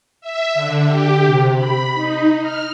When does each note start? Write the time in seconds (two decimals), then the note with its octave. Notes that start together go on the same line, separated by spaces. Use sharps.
0.21 E5
0.54 D3
0.87 G4
1.26 C3
1.55 B5
1.94 D#4
2.41 F6